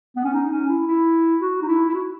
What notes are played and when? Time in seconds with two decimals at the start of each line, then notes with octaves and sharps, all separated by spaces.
0.16 B3
0.24 C#4
0.33 D#4
0.51 C#4
0.69 E4
0.88 E4
1.41 F#4
1.62 D#4
1.68 E4
1.89 E4
1.94 F#4